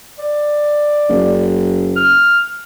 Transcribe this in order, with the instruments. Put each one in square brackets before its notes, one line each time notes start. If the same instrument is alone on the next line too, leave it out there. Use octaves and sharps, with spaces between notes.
[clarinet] D5
[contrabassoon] F#1
[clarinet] F6